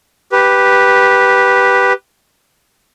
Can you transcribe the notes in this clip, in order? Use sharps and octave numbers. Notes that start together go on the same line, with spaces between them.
G4 B4